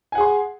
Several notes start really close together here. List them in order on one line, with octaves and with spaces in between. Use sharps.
G#5 F#5 G#4 C6